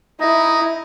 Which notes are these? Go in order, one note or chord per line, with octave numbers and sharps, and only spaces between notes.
D#4 E4